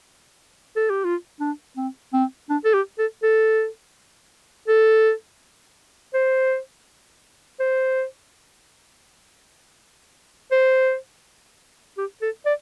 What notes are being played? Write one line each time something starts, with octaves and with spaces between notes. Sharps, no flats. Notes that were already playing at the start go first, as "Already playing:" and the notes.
A4
G4
F4
D4
C4
C4
D4
A4
G4
A4
A4
A4
C5
C5
C5
G4
A4
D5